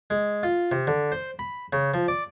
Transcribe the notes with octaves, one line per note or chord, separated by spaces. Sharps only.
G#3
F4
C3
D3
C5
B5
C#3
F3
D5